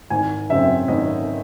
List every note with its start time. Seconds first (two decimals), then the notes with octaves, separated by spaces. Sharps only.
0.10 G#1 G#5
0.49 F#2 C#3 F#3 C4 E5
0.88 G#1 D#5